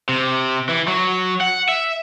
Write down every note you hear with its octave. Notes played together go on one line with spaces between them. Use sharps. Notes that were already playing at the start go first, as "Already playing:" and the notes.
C3
E3
F#3
F#5
E5